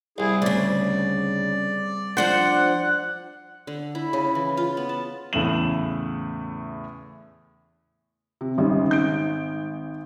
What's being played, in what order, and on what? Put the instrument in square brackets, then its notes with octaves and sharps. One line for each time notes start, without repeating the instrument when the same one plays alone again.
[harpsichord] C2 [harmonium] E4 G#4
[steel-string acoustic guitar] D2 C#3 [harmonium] D5
[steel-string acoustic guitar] F3 D4 C5 [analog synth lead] F#5
[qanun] D3
E4
C#3
E3
F4
B3
A5
[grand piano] E2 A2 C#3 A3 E7 F#7
[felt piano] C3
[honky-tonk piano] G#1 [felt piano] C#3 G3
[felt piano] G6 D7